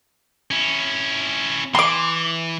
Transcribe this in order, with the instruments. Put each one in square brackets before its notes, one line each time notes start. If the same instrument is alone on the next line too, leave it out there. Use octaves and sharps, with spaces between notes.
[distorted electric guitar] C#4 E4
[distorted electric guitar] E3 [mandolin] C6 D6